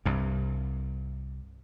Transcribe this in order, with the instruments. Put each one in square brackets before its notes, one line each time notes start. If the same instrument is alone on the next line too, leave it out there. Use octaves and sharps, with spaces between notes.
[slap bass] C2 G2